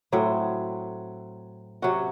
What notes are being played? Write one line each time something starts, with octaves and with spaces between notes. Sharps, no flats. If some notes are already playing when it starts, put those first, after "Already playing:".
A2 F#3 C4
C3 F#3 C#4 F#4